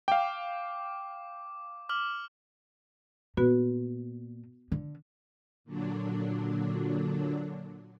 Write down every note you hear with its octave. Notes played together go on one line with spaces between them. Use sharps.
F5 G5 D6
D6 F6 F#7
A#2 B3 F#4 B4
D3
A#2 D3 F#3 D4